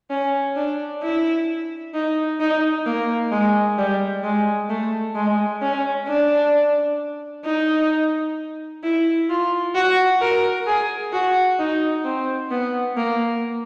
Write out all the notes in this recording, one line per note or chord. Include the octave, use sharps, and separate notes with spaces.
C#4
D4
E4
D#4
D#4
A#3
G#3
G3
G#3
A3
G#3
C#4
D4
D#4
E4
F4
F#4
A#4
G#4
F#4
D#4
C4
B3
A#3